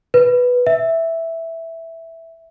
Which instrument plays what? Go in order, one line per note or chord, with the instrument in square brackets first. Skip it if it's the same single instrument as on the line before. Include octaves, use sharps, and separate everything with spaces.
[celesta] B4
E5